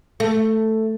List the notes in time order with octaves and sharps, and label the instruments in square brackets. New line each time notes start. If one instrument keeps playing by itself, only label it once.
[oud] A3